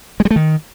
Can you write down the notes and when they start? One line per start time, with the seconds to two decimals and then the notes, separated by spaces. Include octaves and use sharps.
0.20 G#3
0.25 G3
0.31 A3
0.36 D#3